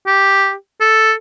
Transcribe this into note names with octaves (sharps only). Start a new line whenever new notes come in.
G4
A4